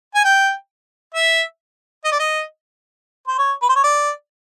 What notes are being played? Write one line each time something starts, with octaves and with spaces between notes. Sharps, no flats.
G#5
G5
E5
D#5
D5
D#5
C5
C#5
B4
C5
C#5
D5